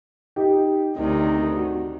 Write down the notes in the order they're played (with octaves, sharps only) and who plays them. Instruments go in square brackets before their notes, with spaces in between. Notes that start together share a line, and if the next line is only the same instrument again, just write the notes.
[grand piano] D#4 G4
[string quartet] D2 C3 D#3 [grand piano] D#4
[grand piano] F#4